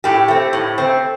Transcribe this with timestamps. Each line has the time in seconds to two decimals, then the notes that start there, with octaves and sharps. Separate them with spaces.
0.04 A2 G4
0.28 A3 C4
0.53 A2
0.78 A3 C4